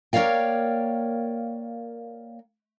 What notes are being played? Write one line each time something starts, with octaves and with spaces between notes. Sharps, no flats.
A#3 A#4 C#5 D5 F5 G5